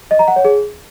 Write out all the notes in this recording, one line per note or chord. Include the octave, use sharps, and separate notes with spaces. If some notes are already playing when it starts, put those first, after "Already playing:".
D#5
A#5
F#5
C#5
G#4